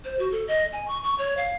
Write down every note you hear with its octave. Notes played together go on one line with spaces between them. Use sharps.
C5
F#4
A4
D#5
G#5
C#6
C#6
C#5
F5